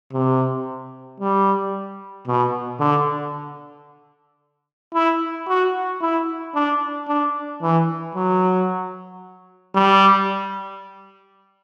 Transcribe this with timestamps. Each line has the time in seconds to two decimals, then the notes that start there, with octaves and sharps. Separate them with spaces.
0.13 C3
1.20 G3
2.27 B2
2.80 D3
4.94 E4
5.48 F#4
6.01 E4
6.55 D4
7.08 D4
7.62 E3
8.15 F#3
9.75 G3